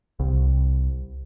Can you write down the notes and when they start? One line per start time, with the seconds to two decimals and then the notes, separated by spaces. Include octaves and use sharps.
0.20 C2